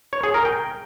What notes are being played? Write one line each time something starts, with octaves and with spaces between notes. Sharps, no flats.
C#5
G#4
A#4
G5